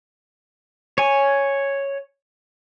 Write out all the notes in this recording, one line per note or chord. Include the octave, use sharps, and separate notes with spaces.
C#5 G#5